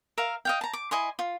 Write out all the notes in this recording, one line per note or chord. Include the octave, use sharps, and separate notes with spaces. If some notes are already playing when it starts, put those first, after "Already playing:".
A#4 E5 F5
D#5 F5 G5
A5 A#5
D6
E4 D#5 G#5 C6
F4